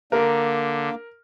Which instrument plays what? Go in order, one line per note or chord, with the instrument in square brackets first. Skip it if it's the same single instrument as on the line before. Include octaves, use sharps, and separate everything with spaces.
[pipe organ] D3 [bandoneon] A#3 [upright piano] A#4